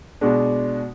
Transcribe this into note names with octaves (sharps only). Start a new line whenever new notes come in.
B2 G#3 D4